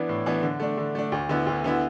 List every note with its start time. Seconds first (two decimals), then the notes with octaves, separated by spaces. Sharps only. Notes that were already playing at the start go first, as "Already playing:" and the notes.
Already playing: E3 B3 D4
0.09 A2
0.26 E3 B3 D4
0.43 D3
0.60 A3 D4
0.77 D3
0.95 A3 D4
1.12 D2
1.29 D3 B3 E4
1.46 D2
1.64 D3 B3 E4